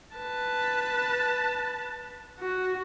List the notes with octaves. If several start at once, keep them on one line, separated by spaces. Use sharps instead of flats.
B4 A5
F#4